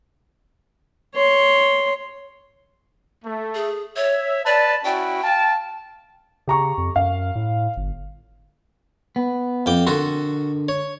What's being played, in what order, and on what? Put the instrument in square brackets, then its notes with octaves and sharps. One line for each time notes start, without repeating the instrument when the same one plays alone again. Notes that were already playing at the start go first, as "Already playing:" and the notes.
[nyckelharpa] C#5 C6
[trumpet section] A3
[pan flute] G#4
[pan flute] C#5 [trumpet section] E5
[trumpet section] B4 A5 [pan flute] D5
[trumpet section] C#4 E4 F#4 [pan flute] G5
[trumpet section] F5 A5
[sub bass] C#3 [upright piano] G4 A#5 C#6
[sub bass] F2
[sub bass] F#2 [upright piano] F5
[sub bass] A2
G1
[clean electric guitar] B3
[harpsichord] F2 G5 D6
[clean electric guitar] D3 A#4 C6 [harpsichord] F#4 A4
[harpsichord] C#5